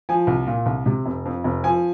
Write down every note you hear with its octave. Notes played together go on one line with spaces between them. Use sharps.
F3 G#5
C2
A#2
C2
C3
F1
F2
F1
F3 G#5